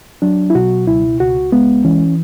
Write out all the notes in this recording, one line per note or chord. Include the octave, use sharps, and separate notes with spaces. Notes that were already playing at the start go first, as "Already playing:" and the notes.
F#3 D4
E4
B2 F#4
C#2 E4
C#2 F#4
G#3 B3
E3 C#4